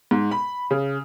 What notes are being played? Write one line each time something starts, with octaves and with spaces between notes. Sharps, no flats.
G#2
B5
C#3